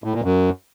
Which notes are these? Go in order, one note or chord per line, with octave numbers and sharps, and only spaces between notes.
A2
A#2
F#2